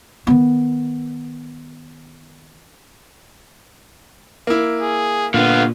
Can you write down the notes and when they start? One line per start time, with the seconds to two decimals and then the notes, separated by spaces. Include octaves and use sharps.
0.27 D#3 B3
4.47 A#3 E4
4.82 G#4
5.34 A#2 D3 B3 F5